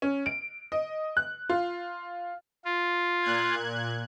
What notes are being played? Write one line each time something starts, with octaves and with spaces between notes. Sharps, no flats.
C#4
D7
D#5
F#6
F4
F4
A#2 F#6 G#6